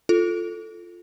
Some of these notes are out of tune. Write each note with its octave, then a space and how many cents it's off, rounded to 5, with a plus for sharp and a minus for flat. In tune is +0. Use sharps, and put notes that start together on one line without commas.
F4 +0 A4 +0